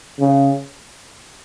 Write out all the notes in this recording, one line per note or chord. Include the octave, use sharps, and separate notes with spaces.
C#3